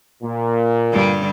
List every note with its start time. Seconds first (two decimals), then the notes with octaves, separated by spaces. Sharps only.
0.23 A#2
0.92 G2 D3 G3